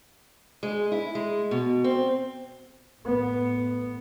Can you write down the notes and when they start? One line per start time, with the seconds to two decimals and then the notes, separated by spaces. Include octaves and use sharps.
0.63 G#3
0.92 E4
1.15 G#3
1.51 B2
1.84 C4
3.02 A2 B3